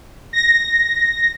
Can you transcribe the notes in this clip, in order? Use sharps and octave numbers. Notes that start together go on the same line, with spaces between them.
A#6